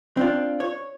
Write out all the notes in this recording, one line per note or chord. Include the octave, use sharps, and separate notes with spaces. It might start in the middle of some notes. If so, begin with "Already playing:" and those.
C4 D4 F4
C#5